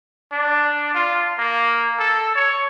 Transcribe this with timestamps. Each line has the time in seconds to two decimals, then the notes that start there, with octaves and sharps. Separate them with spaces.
0.32 D4
0.94 F4
1.38 A#3
1.99 A4
2.35 C#5